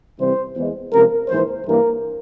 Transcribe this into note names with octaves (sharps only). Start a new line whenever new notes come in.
C2 C3 E3 G3 C4 C5
E2 E3 G#3
C#2 C3 F3 A#4
A#1 G#2 E3 C5
G2 E3 A#3 A#4